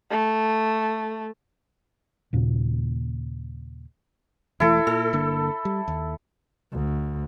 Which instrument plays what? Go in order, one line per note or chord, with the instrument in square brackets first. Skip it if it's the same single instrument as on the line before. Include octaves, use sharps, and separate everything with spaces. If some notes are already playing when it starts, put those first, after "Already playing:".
[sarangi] A3
[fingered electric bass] D#2 A#2 C#3
[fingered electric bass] E1 E3 A3 [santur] E4 A4
[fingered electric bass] A#2 [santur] A4
[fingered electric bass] G1 D3 A#3
G3
D#2
[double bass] D2